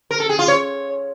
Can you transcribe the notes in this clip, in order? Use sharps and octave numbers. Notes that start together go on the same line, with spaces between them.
A#4
A4
G#4
F4
C#5